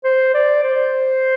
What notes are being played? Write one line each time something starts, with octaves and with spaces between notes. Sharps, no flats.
C5
D5
C5